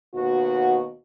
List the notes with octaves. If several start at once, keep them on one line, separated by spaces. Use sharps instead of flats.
D#2 B2 F#4